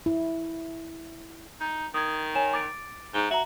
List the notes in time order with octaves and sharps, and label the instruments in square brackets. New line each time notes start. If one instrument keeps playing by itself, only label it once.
[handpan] E4
[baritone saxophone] D#4
[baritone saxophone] D#3 [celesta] D#6 G#6
[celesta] C#5 G#5 E7
D6 A6 D7
[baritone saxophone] G#2 [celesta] G7
[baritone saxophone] F#4 [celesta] E5 A#5